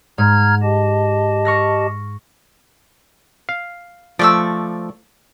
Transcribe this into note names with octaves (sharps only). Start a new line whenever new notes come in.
G#2 A#5 F6 G#6
G4 D#5 A5
C#6 F6 A#6
F5
F3 A3 D5 C#6 E6